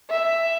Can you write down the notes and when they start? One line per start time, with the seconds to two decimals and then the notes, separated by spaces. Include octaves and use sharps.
0.10 E5